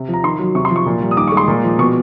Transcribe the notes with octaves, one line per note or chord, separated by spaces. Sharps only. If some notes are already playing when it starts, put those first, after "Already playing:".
Already playing: C3
F3
A#5
D#3 C6
F#3
C3 C#6
C6
F3
C#6
A#2
G3
D#6
D#3 D6
C#6
G#3
C6
A#2
F3
B2 C#6